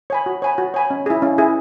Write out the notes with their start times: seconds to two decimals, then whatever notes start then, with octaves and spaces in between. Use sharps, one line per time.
0.10 C#5 G#5 B5
0.26 F#4
0.42 C#5 G#5 B5
0.58 F#4
0.74 C#5 G#5 B5
0.90 C#4
1.06 E4 G#4
1.22 C#4
1.38 E4 G#4